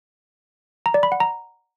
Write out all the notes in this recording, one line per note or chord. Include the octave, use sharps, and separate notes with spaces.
A#5
D5
B5
F#5
A#5